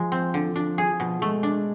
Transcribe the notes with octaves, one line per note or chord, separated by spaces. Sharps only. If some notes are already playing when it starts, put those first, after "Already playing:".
Already playing: F3 G#3
C4
D3
F3 D4
G#4
F3
B2
G#3 A3
D4